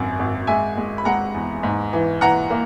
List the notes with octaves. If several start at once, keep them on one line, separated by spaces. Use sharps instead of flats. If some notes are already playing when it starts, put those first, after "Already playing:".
Already playing: G#1 F#2
G#1
G#3 E5 G#5
G#3
B5
G#3 F#5 A#5
E2
G#2
E3
E3 F#5 A#5
A#3